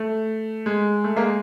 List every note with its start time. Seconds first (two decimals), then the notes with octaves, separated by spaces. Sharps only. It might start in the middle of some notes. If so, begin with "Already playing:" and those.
Already playing: A3
0.66 G#3
1.04 A3
1.16 G#3 A#3